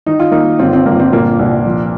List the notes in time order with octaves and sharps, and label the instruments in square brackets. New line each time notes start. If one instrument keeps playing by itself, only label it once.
[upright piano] D#3 D#4
F4
D#3 A#3 D#4
G1 C4 F4
C4
G1 A#3
C4
A#2 A#3
C2
F3